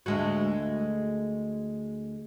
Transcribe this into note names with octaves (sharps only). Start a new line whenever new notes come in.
D2 G#3 F#4